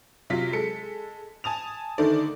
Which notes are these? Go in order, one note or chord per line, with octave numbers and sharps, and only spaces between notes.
C3 F#3 F4 B6
G#3 A4 C#7
G#5 A5 D#6 F7
D3 D#3 A3 D4 A4 D5